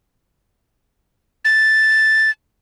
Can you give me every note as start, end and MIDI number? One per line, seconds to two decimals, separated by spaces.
1.45 2.31 93